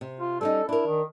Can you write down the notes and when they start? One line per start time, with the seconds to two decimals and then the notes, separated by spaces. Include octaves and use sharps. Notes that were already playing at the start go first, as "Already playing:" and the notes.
0.01 C3
0.20 F4
0.41 G3 C#4 D#4 A4
0.69 D4 E4 A#4
0.87 D#3